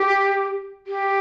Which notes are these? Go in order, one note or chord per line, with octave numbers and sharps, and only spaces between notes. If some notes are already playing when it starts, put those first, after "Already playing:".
Already playing: G4
G4